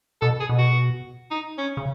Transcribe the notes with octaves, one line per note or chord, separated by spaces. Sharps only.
B2 A4
G#4
B2
F#4
D#4
C#4
C#3